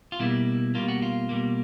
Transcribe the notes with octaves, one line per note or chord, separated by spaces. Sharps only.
F4
B2 G3 A#3 E4
B2 G3 A#3 F4
F#4
F4
B2 G3 A#3